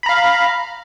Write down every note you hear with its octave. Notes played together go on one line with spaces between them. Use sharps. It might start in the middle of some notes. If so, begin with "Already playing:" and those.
F5 A#5 B5